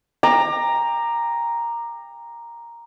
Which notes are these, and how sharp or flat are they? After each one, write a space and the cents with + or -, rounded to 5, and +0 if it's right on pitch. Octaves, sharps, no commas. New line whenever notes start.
G5 +30 A#5 +0 D6 +25